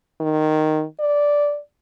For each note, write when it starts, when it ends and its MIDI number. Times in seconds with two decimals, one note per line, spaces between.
0.21 0.84 51
1.00 1.58 74